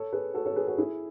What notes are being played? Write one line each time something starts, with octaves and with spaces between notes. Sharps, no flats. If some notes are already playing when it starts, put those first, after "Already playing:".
Already playing: A4 C#5
G#4 B4
F#4 A4
A4 C#5
G#4 B4
F#4 A4
E4 G#4